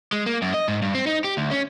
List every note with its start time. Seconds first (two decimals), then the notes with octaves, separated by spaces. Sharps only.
0.13 G#3
0.26 A#3
0.42 F#2
0.54 D#5
0.68 G#2
0.82 G2
0.95 C4
1.07 D#4
1.24 G4
1.37 D2
1.51 C#4